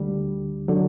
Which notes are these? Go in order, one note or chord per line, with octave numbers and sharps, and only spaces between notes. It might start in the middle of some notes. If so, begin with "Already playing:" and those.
Already playing: D2 D3 G3
D3 F#3